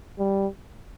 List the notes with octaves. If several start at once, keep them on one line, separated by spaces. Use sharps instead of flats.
G3